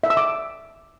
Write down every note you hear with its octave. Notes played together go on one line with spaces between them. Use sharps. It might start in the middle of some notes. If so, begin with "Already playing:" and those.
E5
E6
D6